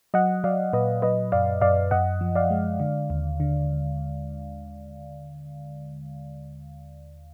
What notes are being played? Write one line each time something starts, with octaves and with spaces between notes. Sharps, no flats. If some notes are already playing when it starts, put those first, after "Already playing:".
F#3 D#5 F#5
F#3 D5 F5
A#2 B4 D#5
F#3 B4 D#5
F#2 D5 F5
F#2 D5 F5
F#2 D#5 F#5
F3
D5 F5
G#3
D3
D#2
D3